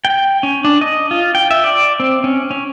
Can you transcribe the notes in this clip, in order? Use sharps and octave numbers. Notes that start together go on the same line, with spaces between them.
G5
C#4
D4
D#5
F4
G5
E5
D5
C4
C#4
C#4